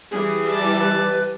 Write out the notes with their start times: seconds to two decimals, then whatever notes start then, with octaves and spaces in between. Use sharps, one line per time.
0.11 E3 G3 G#4
0.50 D5 A5
0.80 B4